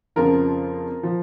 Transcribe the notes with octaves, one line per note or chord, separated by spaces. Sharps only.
F2 C#3 F3 F4 A#4
F3